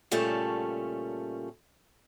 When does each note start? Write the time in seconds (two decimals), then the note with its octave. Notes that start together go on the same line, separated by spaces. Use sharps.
0.11 A#2 C#3 G3 A3 C#4 A5